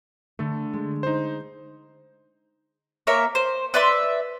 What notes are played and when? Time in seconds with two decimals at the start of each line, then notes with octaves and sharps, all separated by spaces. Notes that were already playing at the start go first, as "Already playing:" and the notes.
0.39 D3 A3 A4
0.73 G#3
1.03 D#4 C5
3.07 A#3 A#4 C#5 E5
3.35 C5
3.74 B4 D5 E5 C6